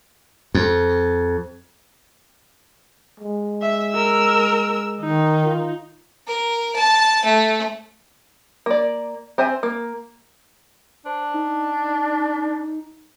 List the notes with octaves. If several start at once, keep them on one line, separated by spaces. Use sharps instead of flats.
F2
G#3
E5
A#4 E6
D#3 D#4
F4
A#4
A5
A3
A#3 D5
C4 C5 E5 G#5
A#3
D4 C5
D#4